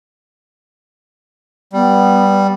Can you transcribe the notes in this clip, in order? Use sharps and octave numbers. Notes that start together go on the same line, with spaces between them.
G3 B3